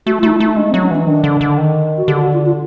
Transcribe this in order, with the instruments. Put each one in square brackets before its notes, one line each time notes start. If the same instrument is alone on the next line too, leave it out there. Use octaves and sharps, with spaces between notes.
[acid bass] A3 [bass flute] F#4
[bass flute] F4
[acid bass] A3 [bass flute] D#4
[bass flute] E4
[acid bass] A3 [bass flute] D#4
[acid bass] G#3 [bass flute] D4
[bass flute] C4
[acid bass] F#3
[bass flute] C#4
[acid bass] E3 [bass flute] D4
[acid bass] D#3 [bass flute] D4
[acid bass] D3
D3
D#3
[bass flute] F#4
[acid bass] D3 [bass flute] G4
[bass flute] F#4
F4
F4